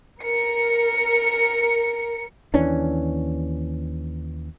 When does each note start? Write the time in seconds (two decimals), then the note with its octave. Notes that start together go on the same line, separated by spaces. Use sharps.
0.22 A#4 C#7
2.54 D#2 E3 C#4 D4